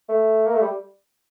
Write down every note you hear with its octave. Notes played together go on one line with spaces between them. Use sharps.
A3
A#3
A3
G3